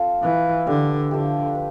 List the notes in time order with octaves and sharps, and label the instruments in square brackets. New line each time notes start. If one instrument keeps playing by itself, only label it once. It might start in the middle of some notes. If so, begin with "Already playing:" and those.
Already playing: [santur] C4 F4 A4
[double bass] E3 [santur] E4 B4 F5
[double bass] D3 [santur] E4 G4 D5
[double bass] D3 [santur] F3 A3 E4 G4
[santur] B4